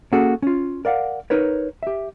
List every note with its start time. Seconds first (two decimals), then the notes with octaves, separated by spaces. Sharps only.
0.12 A#3 C#4 F#4 G#4 A4
0.42 C#4 F4
0.85 A#4 D5 F5 F#5
1.30 D#4 A#4 B4 C#5
1.83 G4 E5